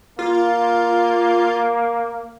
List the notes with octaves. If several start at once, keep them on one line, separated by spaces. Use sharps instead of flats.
A#3 F4